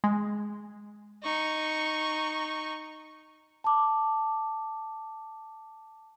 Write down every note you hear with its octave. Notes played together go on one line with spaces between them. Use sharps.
G#3
D#4 C#6
A5 D6